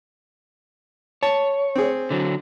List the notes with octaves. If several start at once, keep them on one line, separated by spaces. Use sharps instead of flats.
C#5 A5
C4 G#4
D3 F#3